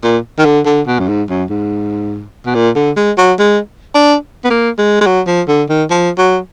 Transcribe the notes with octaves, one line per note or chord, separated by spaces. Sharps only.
A#2
D#3
D3
D3
B2
F#2
G#2
F#2
G#2
B2
A#2
D3
G#3
F#3
G#3
D4
B3
A#3
G#3
G#3
F#3
F3
D3
D#3
F3
F#3